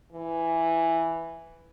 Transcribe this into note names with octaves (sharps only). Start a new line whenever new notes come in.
E3